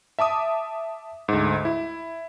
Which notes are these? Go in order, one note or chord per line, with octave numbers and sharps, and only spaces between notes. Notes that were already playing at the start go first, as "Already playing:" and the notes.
E5 A5 D6 D#6
D2 G#2
E4